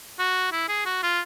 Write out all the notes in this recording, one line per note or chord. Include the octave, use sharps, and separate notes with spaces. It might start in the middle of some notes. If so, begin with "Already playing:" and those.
F#4
E4
G#4
F#4
F4